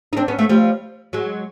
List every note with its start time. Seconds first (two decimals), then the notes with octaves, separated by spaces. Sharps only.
0.13 D#4
0.17 C4 D4
0.28 B3 C#4
0.39 A3 B3
0.49 F3 G3
1.13 F#3 G#3